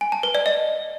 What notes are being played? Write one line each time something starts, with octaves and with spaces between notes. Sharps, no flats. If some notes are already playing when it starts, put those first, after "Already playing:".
G#5
A5
B4
D5
D#5